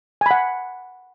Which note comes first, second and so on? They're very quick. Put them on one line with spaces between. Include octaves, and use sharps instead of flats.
G#5 B5 F#5